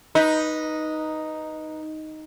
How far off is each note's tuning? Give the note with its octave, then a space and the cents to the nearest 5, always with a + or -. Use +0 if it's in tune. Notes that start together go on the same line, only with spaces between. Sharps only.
D#4 +0 B4 -15